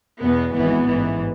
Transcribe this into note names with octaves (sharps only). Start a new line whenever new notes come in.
E2 B2 B3
G#1 G#2 E3 B3
A1 G#2 E3